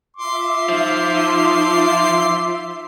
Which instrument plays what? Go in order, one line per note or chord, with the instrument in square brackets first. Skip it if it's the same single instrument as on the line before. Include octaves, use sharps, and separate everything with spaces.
[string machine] F4 E5 [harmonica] C6 D6
[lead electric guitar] F3 [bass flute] D#4